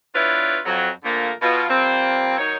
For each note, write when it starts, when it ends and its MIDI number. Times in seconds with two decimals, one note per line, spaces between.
0.15 0.58 59
0.15 0.58 62
0.15 0.58 64
0.15 0.58 65
0.15 0.58 71
0.15 0.58 73
0.66 0.90 41
0.66 0.90 54
1.04 1.31 46
1.04 1.31 50
1.04 1.31 53
1.04 1.31 57
1.04 1.31 58
1.04 1.31 70
1.42 1.68 47
1.42 1.68 65
1.69 2.38 53
1.69 2.38 55
1.69 2.38 58
1.69 2.38 60
2.38 2.57 51
2.38 2.57 54
2.38 2.57 63
2.38 2.57 73